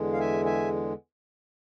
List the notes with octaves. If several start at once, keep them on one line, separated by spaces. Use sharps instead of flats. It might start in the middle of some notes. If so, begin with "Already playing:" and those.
Already playing: E2 D3 G#3
F5
E5 G#5
E5 G#5